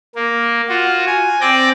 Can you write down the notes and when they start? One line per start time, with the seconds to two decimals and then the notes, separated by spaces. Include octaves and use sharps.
0.15 A#3
0.69 F4 F#4
1.07 G#5
1.41 C4 D5 G5 G6 A#6